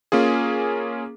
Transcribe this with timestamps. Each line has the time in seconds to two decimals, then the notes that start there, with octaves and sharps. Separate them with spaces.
0.12 A#3 C#4 F4 G#4